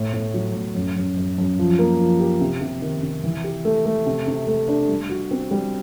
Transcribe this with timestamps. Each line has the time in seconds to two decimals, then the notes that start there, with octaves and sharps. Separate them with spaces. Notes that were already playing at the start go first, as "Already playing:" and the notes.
Already playing: A2
0.13 A2
0.34 F#3
0.55 A2
0.75 F#2
0.96 F#2
1.17 F#2
1.38 F#2
1.59 F3
1.79 A#3
1.99 F3
2.20 G4
2.41 C3
2.61 C3
2.82 D#3
3.03 C3
3.23 E3
3.44 G4
3.65 A3
3.86 A3
4.06 C3
4.27 C3
4.47 A3
4.68 D4
4.88 G3
5.10 F#4
5.31 C4
5.51 G3